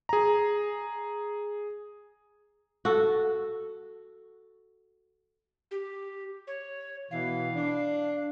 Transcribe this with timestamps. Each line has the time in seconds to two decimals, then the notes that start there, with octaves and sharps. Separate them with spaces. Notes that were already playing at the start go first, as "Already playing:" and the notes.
0.09 G#4 A#5
2.85 F#4 A4
5.71 G4
6.47 C#5
7.11 B2 E3 F5
7.54 D4